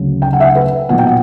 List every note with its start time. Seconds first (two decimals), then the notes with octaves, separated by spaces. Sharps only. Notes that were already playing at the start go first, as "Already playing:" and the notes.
Already playing: D2 C#3 F#3
0.22 G5
0.33 F#5
0.40 E5
0.44 F#5
0.55 B4
0.89 B1 A#2 F#3 B3 F#5
0.98 G5
1.07 F#5